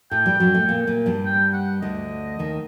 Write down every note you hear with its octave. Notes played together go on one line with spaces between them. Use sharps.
A2 A3 G5
G2 G3
F#2 F#3
A2 A3
A#2 A#3
A#2 A#3
G2 G3
G5
F#5
D2 D3 D#5
D#2 D#3